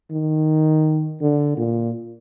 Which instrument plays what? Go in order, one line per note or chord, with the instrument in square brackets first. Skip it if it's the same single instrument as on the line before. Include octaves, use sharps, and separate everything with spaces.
[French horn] D#3
D3
A#2